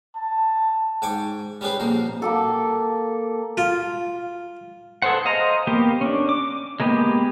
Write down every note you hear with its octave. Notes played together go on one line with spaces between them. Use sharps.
A5
G#2 G5 G#5 C#6 D6
G3 C#4 G4 G#4 B4 C5
A#1 F2 A#3 C5
A#3 G4 A4
F4
G#4 A4 B4 C5 F#5
C5 D#5 F5 A#5
A#3 B3 G4
C#4 D4
D6
G#3 A#3 B3 G4